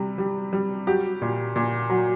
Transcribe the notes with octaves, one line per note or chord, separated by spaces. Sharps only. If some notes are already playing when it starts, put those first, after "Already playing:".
Already playing: C3 G3
G3
G3
F#3 G4
A#2
A#2
F#3